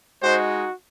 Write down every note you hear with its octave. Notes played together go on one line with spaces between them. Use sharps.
G#3 D#4 F#4 C5